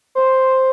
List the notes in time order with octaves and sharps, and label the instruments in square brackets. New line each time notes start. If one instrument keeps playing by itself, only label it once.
[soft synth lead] C5